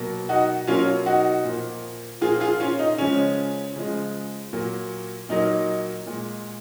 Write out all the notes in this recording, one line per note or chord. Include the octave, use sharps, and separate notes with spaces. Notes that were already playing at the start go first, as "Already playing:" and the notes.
Already playing: B2 F#3 A#3
D#4 F#4
B2 F#3 A#3 C#4 F4
D#4 F#4
A#2 F3 A#3
A#2 F3 A#3 F4 G#4
F4 G#4
C#4 F4
D#4
C#3 F3 G#3 C#4
C#3 F3 G#3
A#2 F#3 A#3
A#2 F#3 A#3 D#4
A#2 G#3